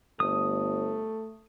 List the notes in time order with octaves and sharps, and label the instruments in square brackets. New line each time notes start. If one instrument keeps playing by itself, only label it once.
[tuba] G1 [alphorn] A3 [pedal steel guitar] D#6